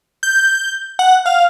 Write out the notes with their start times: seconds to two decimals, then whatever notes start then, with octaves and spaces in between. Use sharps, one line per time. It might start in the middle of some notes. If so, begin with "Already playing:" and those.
0.23 G6
0.99 F#5
1.26 F5